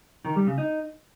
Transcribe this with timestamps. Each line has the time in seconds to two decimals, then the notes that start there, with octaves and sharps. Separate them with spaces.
0.25 D#3
0.36 G3
0.47 C#3
0.58 D#4